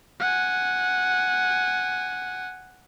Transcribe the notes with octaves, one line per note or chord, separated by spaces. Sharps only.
F#5 G#5